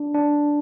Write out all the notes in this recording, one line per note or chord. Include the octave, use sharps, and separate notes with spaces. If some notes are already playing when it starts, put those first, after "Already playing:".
Already playing: D4
D4